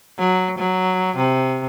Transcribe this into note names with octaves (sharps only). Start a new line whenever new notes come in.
F#3
F#3
C3